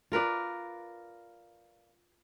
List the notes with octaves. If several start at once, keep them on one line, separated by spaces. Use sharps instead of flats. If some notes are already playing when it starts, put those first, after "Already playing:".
F4 A#4 B4 D5